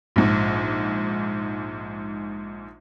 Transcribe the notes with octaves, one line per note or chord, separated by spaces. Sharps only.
A#1 G#2